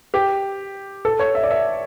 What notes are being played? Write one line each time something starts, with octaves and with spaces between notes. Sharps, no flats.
G4
A4
C#5
E5
D5
E5